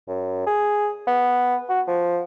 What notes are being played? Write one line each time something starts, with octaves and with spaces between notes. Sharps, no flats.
F#2
G#4
B3
F#4
F3